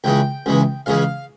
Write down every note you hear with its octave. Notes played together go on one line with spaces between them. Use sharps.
C#2 C#3 E3 G#3 G5
C#2 C#3 E3 G#3
C#2 C#3 E3 G#3 F5